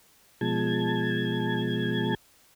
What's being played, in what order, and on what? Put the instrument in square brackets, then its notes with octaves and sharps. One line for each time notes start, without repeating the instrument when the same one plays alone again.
[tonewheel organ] B2 F3 G#3 A5 G#6